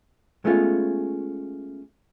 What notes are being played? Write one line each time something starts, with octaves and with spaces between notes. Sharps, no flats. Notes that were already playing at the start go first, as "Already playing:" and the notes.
G#3 A3 B3 C#4 F4